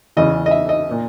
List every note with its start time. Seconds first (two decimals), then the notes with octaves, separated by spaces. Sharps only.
0.17 E2 C#3 E3 D#5
0.46 D#5
0.51 E5
0.69 D#5
0.91 A#2